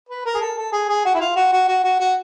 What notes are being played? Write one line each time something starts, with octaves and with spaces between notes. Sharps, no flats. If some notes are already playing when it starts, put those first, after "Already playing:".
B4
A#4
G#4
A4
A4
G#4
G#4
F#4
E4
F4
F#4
F#4
F#4
F#4
F#4